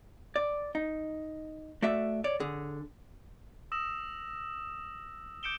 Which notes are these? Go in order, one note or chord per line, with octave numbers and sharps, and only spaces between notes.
D5
D#4
A3 F#4 D5 E5
C#5 D5
D3 G#4
D#6 E6 A#6 E7
D6 G6 C#7 D7 E7 G7